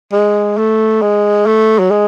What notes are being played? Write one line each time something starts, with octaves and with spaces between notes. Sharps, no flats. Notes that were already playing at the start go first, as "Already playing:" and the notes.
G#3
A3
G#3
A3
F#3
G#3